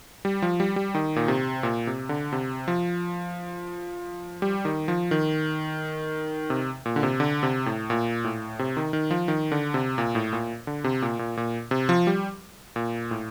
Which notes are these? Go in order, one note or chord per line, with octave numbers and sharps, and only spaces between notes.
G3
F3
G3
G3
D#3
A#2
C3
A#2
C3
D3
C3
F3
G3
D#3
F3
D#3
C3
A#2
D3
C3
D3
C3
A2
A#2
A2
C3
D#3
D#3
F3
D#3
D3
C3
A#2
A2
A#2
D3
C3
A#2
A#2
A#2
C3
F3
G3
A#2
A2